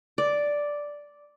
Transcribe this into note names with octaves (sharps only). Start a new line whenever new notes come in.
D5